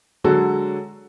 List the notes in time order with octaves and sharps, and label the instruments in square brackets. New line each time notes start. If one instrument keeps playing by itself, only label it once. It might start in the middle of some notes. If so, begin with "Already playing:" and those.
[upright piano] D3 F#3 G#3 F#4 A4